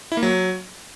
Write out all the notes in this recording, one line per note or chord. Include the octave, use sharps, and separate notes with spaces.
E4
A#3
F#3